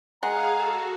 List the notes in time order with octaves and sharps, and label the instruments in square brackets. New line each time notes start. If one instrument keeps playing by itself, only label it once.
[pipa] G#3 [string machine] G#4 F5 [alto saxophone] F#5 [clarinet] A#5
[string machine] F#4 [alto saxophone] A4